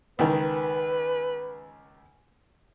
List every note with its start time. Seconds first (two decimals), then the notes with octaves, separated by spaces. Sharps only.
0.19 C#2 D#3 B4